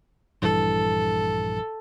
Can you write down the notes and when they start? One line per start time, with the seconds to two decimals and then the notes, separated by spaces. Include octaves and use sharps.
0.42 A#1 G2 E3 A4